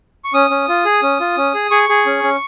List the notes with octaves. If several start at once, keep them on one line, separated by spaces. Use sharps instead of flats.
C#6
C#4 D#6
C#4
F4
G#4
C#4
F4
C#4
G#4
G#4 C#6
G#4
C#4
C#4